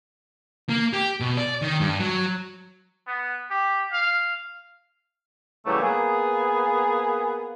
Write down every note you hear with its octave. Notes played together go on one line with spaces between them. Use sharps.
A#3
G4
B2
D5
D#3
G2
F#3
B3
G4
F5
A2 C#3 E3 F#3 G3 A3
A#3 B3 G#4